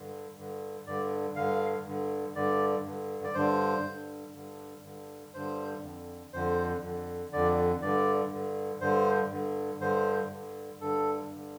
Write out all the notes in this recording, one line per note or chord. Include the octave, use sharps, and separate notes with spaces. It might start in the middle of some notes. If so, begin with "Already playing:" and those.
Already playing: G2 D3
G2 D3
G2 D3 D5
G2 D3 F5
G2 D3
G2 D3 D5
G2 D3
D5
G2 D3 C5
G2 D3
G2 D3
G2 D3
G2 D3 C5
F2 D3
F2 D3 C5
F2 D3
F2 D3 D5
G2 D3 D5
G2 D3
G2 D3 C5
G2 D3
G2 D3 C5
G2 D3
G2 D3 A4
G2 D3